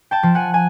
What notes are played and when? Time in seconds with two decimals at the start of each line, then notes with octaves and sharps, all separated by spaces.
0.11 G5 A5
0.23 F3
0.35 F#5 G#5
0.54 G#5